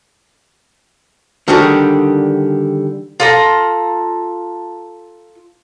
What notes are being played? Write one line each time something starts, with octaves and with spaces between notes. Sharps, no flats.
D3 D#3 G3 D4 F#4 G#4
F4 A4 A#5